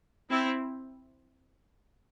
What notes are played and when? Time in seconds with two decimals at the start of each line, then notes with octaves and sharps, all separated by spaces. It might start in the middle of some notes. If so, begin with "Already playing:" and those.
0.31 C4 E4